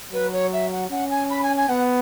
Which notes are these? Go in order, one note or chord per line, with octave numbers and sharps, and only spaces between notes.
F#3 B4
C#5
E5
F#5
C#4 F#5
G#5
B5
G#5
G#5
B3 F#5